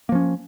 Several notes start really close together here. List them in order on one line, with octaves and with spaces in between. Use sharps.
A#3 F3 C#4